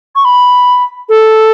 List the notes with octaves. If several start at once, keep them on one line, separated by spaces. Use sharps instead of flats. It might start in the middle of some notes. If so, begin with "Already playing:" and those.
C#6
B5
A4